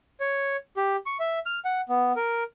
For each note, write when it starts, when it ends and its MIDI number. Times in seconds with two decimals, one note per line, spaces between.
0.20 0.57 73
0.77 0.96 67
1.06 1.17 85
1.20 1.39 76
1.46 1.59 89
1.65 1.81 78
1.89 2.12 59
2.16 2.44 70